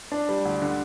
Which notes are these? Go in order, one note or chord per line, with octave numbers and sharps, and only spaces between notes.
D4
G3
D2
D3